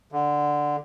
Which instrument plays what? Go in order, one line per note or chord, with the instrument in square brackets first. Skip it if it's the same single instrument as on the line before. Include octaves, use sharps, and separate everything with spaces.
[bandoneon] D3